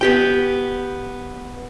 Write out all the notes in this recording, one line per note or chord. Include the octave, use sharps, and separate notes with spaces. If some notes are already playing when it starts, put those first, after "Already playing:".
B3 G4 G5